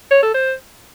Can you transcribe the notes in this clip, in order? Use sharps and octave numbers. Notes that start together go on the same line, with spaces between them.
C#5
A4
C5